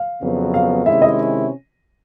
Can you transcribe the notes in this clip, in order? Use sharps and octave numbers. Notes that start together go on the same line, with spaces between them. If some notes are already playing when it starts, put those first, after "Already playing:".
Already playing: F5
F2 C#3 F#3 B3
F5
C3 D#3 G#3 C#4 E4 E5
D#5